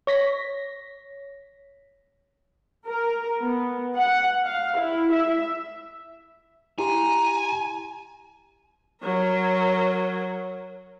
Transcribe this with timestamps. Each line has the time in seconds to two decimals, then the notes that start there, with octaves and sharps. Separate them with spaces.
0.07 C#5 A#6 B6
2.87 A#4
3.41 B3
3.96 F#5
4.45 F5
4.78 E4
5.12 E5
6.79 E4 G4 G#5 A#5 C6
9.02 F#3 A#4